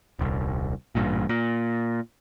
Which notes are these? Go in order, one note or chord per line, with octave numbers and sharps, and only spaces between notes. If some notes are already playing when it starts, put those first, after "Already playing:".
D#1 C2
A1 G2 A#2
A#2